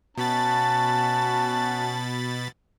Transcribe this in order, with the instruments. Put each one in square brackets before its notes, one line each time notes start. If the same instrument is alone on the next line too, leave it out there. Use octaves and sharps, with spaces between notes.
[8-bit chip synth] B2 B5 A6 [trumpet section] C#4 F#4 A5